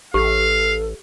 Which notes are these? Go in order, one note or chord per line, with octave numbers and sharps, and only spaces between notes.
A1 G4 A4 F5